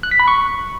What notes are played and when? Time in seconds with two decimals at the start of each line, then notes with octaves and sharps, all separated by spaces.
0.03 F#6
0.11 B6
0.20 B5
0.28 C#6